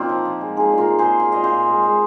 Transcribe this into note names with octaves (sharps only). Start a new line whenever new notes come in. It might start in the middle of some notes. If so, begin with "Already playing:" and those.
Already playing: A#2 A#3 C4 D#4 F4
F3
F3
G#3
G#3 D#4 G#4
A#2
F4 A#4
G#3
G#4 C5
A#2
G#3 F5
A#2 D#5
C5 F5
A#2
G#3
G#3